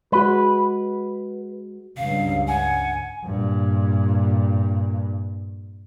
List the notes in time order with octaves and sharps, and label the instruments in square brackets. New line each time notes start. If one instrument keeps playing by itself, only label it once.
[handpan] G#3 F#4 [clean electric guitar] B4
[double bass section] C#2 G2 [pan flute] F5
[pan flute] F#5 [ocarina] G#5
[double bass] G2 A#2